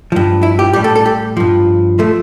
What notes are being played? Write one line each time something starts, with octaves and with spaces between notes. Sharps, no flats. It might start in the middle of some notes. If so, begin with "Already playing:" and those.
G2 F3
E4
G4
A2 G3 G4
A4
A4
G4
G2 F3
F3 A3